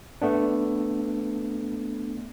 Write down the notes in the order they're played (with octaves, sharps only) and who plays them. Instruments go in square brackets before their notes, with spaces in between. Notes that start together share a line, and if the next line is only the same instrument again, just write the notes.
[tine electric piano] A3 B3 D4